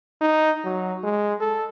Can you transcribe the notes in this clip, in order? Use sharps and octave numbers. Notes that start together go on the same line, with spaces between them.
D#4
F#3
G#3
A4